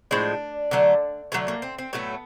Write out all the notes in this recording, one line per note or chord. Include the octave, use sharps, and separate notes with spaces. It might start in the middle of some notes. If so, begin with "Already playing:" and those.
A2 F3 G#3 D4
D3 F#3 A3
D3 F#3 A3 C#4
A#3
C4
C4
A2 F#3 A3 B3